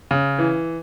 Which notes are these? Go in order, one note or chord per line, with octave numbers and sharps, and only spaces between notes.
C#3
E3